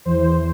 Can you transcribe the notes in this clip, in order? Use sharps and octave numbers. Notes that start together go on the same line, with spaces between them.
E2 E3 C5